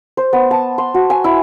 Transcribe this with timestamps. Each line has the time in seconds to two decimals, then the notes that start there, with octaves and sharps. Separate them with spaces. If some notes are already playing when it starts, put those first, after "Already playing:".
0.17 C5
0.33 B3
0.51 A5
0.78 C6
0.94 F#4
1.10 G#5
1.24 E4